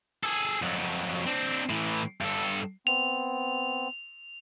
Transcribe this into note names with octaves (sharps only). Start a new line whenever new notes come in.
G#4 A4
F2 F#3
C4 D4
A2 E3
G2 A4
B3 C4 F7